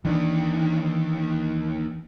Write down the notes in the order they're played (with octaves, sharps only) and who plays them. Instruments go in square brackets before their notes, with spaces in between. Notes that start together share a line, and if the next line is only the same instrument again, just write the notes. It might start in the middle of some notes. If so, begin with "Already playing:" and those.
[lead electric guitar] D#2 D#3 [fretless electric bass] E3 D4